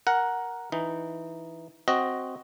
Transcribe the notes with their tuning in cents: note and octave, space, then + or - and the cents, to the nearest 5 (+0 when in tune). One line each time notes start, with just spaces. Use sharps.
A#4 +5 F#5 +0
E3 +0 D#4 +0
C4 +0 F#4 +5 D#5 +0